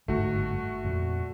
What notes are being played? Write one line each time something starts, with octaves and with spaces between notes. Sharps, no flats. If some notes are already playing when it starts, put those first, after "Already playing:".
G1 G#2 D#3 A3 F#4
F2 A#2